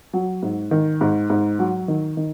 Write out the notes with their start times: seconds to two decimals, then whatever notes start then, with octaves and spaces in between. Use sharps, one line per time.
0.13 F#3
0.42 G#2
0.71 D#3
1.01 G#2
1.30 G#2
1.59 F#3
1.88 D#3
2.17 D#3